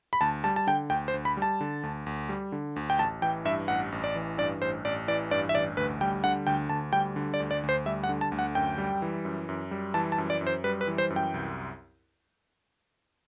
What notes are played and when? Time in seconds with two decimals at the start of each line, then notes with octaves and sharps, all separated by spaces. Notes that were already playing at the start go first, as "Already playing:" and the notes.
0.13 B5
0.21 D2 A5
0.44 G3 A5
0.56 A5
0.67 D3 G5
0.90 D2 G5
1.08 C5
1.14 D2
1.25 B5
1.37 G3
1.42 A5
1.61 D3
1.83 D2
2.06 D2
2.29 G3
2.52 D3
2.76 D2
2.90 G5
2.99 A1 A5
3.22 E3 G5
3.45 G2 E5
3.68 A1 F#5
3.92 A1
4.04 D5
4.15 E3
4.38 G2 D5
4.62 A1 C5
4.85 A1 D5
5.08 E3 D5
5.31 G2 D5
5.49 E5
5.55 A1 D5
5.77 D2 B4
6.01 G3 G5
6.24 D3 F#5
6.47 D2 G5
6.69 D2 A5
6.93 G3 G5
7.16 D3
7.34 D5
7.40 D2
7.51 D5
7.63 D2
7.69 C5
7.86 G3 E5
8.04 F#5
8.09 D3
8.21 A5
8.32 D2
8.39 F#5
8.55 F#2 G5
8.78 G3
9.02 E3
9.25 F#2
9.49 F#2
9.71 G3
9.94 E3 A5
10.12 A5
10.18 F#2
10.30 D5
10.41 F#2
10.47 C5
10.64 G3 B4
10.81 B4
10.87 E3
10.98 C5
11.10 F#2
11.16 G5
11.34 C2